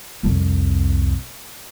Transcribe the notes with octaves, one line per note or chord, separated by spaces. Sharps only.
C2 F2